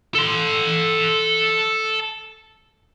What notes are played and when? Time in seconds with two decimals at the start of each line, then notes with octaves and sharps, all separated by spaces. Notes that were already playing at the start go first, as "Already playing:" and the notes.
0.15 A4 C6